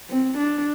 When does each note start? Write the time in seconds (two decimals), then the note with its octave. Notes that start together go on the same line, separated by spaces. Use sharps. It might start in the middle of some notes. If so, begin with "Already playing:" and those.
0.09 C4
0.37 D4